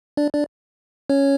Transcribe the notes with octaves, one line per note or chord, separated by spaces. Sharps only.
D4 D5
D4 D5
C#4 C#5